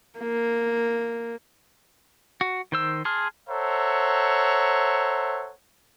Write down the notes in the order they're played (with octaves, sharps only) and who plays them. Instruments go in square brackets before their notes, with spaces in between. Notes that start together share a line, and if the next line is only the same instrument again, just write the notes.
[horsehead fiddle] A#3
[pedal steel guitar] F#4
D#3 C5 E6
G#4 A5 C6 F6
[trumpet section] A4 C5 C#5 E5 F#5 A#5